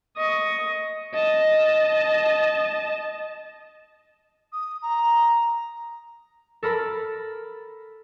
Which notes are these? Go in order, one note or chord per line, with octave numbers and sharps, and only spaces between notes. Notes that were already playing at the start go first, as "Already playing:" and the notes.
D#5 C#6
D#5 A5
D#6
A#5
A4 A#4 B5